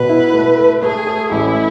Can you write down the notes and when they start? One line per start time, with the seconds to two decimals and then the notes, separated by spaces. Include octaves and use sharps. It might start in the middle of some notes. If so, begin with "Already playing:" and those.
Already playing: B2 B4
0.09 E4
0.33 A3
0.58 A4
0.82 A3 G#4
1.07 A4
1.31 A1 E4